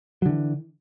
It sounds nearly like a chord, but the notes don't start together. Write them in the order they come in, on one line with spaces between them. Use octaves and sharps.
F#3 D3 E3